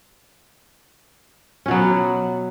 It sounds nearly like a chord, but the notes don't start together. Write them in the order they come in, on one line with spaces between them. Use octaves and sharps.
C#4 B2 F#3 B3